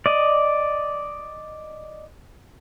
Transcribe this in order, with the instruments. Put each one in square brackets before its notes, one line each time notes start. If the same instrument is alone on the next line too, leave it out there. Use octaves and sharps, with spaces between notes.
[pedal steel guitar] D5 D#5